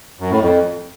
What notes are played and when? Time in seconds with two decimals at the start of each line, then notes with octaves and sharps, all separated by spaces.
0.20 F#2
0.30 A2
0.40 F2